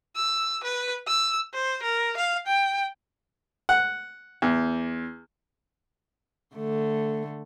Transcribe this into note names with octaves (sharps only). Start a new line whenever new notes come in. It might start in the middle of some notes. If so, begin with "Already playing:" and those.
E6
B4
E6
C5
A#4
F5
G5
F#5
E2
D3 A3